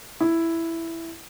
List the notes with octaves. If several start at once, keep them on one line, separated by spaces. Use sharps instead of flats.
E4